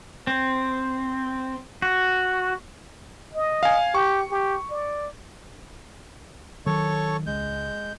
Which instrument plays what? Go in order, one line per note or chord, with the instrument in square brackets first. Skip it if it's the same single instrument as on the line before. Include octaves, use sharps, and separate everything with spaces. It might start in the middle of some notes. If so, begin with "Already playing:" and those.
[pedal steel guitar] C4
F#4
[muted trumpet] D#5
[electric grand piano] F5 G#5
[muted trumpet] G4 [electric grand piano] C#6
[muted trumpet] G4
D5
[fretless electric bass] D#3 F#3 [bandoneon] A4 C#5 C#6
[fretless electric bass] C#2 [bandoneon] G#3 G6